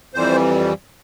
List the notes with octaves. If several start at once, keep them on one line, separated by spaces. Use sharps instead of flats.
F2 E3 G3 C5